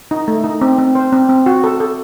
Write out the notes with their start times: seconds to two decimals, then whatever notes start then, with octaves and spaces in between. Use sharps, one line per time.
0.11 D#4
0.28 A3
0.44 D#4
0.61 C4
0.78 C4
0.95 C5
1.13 C4
1.29 C4
1.46 F#4
1.64 A4
1.80 A4